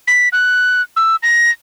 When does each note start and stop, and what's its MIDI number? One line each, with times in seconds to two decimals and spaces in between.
0.07 0.29 95
0.33 0.82 90
0.96 1.16 88
1.23 1.50 94